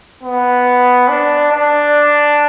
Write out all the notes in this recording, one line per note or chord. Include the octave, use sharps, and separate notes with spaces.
B3
D4
D4